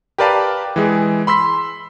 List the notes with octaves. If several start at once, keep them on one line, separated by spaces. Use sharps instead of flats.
G4 A#4 B4 D5 F5 A5
E3 G#3 G#4
B5 C6 E6 B6